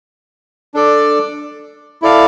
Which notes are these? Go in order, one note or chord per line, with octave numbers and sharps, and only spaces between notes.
D4 A4 D5
E4 A4 D5 F5